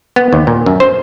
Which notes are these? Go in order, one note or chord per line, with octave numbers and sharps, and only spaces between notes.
B3
D#2
A#2
F#2
C5